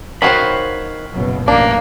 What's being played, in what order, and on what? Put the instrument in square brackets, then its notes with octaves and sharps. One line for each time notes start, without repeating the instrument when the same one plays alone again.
[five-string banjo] D#3 F#4 C5 [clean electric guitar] C#5 F5 B5
[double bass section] F#1 B2 F#3
[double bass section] A1 F#2 A2 [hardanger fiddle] A#3 [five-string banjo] D4